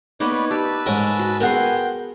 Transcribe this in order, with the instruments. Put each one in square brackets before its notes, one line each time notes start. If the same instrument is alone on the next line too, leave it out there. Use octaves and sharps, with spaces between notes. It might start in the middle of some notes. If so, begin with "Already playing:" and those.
[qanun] A#3 B3 D#4 [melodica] B4 C#5 D5
[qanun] G4 [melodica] B4 A5 E6
[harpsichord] G#2 C#4 D#5 [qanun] A#4
[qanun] F#4
[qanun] B3 G#4 [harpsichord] A#4 F#5 C6 [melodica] G5